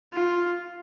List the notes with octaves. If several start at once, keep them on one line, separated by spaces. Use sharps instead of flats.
F4